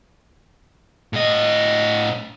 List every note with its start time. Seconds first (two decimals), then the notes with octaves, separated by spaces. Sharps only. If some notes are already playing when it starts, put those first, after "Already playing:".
1.13 A2 D#5